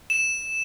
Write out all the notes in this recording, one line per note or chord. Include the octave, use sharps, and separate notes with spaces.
E7